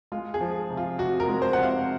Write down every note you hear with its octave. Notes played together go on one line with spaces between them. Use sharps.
G#3 F4
G#4
F3
C3
F4
C3 F#4
A#4
G#3
C5
C3 F#5
F5